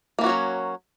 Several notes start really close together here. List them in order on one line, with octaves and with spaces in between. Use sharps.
A#3 E3 F#4 C#4 F#3